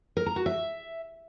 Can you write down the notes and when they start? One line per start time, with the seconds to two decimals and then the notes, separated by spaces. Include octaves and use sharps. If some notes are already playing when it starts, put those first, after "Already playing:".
0.17 A#4
0.26 A#5
0.36 F#4
0.46 E5